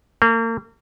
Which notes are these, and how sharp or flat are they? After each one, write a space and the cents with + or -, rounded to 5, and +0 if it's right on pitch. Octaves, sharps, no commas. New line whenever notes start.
A#3 -35